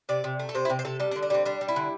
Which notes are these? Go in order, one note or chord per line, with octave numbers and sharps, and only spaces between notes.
C3 D5
C3
A3
A4
C3 C5
E4
C3 G4
C5
C3 A4
G3 A4
D4
D3
D4
G3 C4
G3 D4
G3
E4
D3